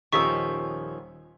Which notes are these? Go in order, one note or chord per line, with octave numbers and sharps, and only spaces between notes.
D#1 D#3 F3 C#4 C#6 E6 B6